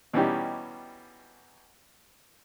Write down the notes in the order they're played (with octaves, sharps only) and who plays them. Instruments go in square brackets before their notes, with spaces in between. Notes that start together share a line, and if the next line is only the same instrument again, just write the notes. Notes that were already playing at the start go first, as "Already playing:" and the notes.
[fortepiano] B2 E3 G3 C#4 D#4 G4